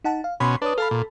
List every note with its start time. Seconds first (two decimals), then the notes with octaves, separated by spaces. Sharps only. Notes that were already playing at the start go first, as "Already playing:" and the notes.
0.04 D#4 F#5 A5
0.24 F5
0.40 B2 C#4 B5 C6
0.62 D4 B4 C#5 D#6
0.78 A4 F5 A5 B5
0.91 A#2